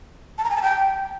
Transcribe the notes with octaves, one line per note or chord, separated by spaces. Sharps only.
A5
A#5
G#5
A5
G5